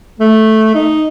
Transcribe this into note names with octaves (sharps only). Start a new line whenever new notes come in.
A3
D#4